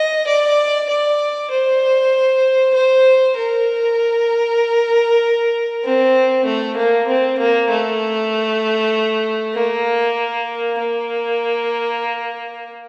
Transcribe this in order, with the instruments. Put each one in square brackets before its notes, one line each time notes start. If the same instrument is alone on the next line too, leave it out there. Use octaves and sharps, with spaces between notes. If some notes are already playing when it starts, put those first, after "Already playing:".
Already playing: [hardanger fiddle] D#5
D5
D5
C5
C5
A#4
C4
A3
A#3
C4
A#3
A3
A#3
A#3